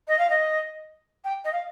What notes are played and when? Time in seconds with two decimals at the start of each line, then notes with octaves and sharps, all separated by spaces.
0.08 D#5
0.18 F5
0.30 D#5
1.24 G5
1.44 D#5
1.52 F5